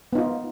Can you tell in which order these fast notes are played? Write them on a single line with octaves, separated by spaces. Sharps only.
B3 D#4 F4